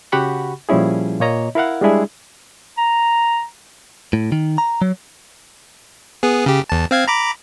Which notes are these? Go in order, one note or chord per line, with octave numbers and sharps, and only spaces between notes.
C#3 F#4 G4 F#5 B5 C#6
A#2 F3 G3 C#4 E4 G#4
A#2 A#3 C#5 D#5 A#5
E4 A#4 F5 F#5
G3 G#3 D4 E4 G#4
A#5
A2
D#3
A#5
F#3
B3 G#4
C#3 G4
E2 A5
C4 F5 G#6
A#5 B5 D6